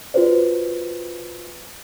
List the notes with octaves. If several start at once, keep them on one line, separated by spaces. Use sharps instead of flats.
F4 F#4 G#4 B4 C5 D5